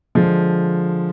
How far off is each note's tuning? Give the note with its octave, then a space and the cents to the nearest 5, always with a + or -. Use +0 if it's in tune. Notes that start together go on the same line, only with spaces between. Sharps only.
D3 +0 F3 +0 G#3 +0